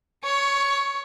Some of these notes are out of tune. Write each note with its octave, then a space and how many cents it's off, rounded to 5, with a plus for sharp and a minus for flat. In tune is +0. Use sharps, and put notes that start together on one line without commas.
C#5 +15 C#6 +0